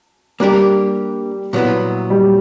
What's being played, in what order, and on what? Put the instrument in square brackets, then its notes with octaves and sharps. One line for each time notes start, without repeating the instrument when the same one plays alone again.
[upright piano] G3 [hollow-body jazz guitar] A#3 D4 G4 A#4
[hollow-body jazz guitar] A#2 F#3 B3 E4
[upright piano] G3